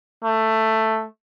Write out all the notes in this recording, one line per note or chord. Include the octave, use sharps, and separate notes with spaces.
A3